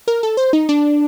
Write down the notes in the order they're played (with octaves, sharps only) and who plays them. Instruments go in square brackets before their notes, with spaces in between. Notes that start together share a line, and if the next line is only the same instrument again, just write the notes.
[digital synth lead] A#4
A4
C5
D#4
D4